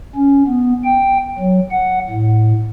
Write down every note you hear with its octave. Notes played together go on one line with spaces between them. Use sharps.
C#4
B3
G5
F#3
F#5
A2